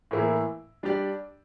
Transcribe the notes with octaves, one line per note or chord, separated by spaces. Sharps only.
A2 E3 A#3 E4
G3 D4 G4 D5